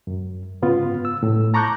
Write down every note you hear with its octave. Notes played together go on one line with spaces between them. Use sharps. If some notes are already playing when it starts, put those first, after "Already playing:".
F#2
G#2 C#3 B3 F4
E6
A2
A5 A#5 C#6 D6 F#6 G6